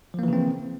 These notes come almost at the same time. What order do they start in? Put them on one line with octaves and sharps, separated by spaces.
F3 A#3 E3 C#3 C4